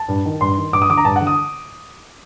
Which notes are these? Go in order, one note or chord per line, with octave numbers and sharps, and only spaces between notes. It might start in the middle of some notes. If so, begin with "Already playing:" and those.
Already playing: A5
G2
D#3
G2 C6
D#3
G2 D6
D#6
D3 D6
A#5
G2 A5
F#5
D3
D#6